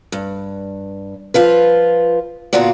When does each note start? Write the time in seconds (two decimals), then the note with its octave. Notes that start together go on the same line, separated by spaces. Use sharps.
0.12 G2
1.34 F3 F4 B4
2.53 A#2 D3 B3 F4 F#4 D5